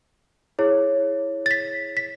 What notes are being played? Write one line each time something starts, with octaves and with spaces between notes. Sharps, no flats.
E4 G#4 C#5
A6
B6
B6